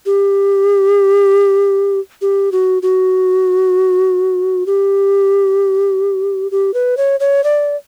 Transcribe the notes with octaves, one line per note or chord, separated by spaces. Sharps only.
G4
G4
F#4
F#4
G4
G4
B4
C#5
C#5
D5